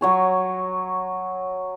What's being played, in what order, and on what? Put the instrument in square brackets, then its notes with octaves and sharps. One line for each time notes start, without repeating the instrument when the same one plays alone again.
[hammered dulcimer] F#3 C#5 G#5